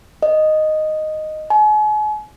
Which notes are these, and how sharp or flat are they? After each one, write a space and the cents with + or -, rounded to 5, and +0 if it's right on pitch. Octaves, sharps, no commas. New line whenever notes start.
D#5 -5
G#5 +40